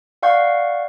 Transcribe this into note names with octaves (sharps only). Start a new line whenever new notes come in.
D5 F5 F#5 C#6 G6